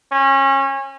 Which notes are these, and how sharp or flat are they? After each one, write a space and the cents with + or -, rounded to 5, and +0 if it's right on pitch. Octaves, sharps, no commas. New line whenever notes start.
C#4 -25